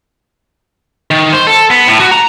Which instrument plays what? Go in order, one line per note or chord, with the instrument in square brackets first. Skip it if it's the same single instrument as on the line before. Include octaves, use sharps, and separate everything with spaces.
[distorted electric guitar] D#3
C5
A4
B3
A2
F#4
A#5